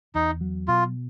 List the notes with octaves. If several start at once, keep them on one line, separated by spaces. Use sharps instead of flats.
E2 D#4
F#3
B2 F4